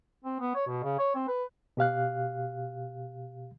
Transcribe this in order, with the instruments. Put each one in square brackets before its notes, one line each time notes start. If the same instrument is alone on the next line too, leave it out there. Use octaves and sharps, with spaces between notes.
[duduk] C4
B3
C#5
B2
C#3
C#5
C4
B4
[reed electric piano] B2 G4 F5 F#6